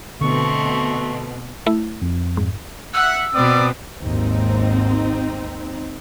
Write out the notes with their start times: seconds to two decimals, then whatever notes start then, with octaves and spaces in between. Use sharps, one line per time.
0.21 B2 D3 A3 C4 C#6
1.66 A3 E4
2.02 F2
2.37 G#2
2.94 E5 F#5 E6
3.34 B2 B3 C4 D5 D#6
4.04 G#1 D#2 G#2 C4 D#4